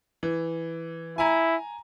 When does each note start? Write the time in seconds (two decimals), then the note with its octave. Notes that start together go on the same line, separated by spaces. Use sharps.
0.23 E3
1.18 E4 G#5 A#5